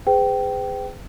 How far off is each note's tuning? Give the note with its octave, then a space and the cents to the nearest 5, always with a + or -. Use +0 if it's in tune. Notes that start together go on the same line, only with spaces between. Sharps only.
G#4 -15 B4 +45 G5 -15